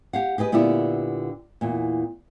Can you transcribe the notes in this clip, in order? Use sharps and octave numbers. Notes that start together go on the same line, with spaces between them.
G4 F5 F#5
G4 G#4 B4 D#5
A#2 D3 B3 E4 G4 D5
E2 A#2